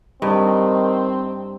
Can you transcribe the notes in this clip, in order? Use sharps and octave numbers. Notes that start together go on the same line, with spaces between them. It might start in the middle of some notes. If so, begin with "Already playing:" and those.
G2 D#3 C4